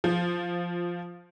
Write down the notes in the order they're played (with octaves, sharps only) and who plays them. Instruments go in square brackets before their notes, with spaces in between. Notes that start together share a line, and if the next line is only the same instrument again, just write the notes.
[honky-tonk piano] F3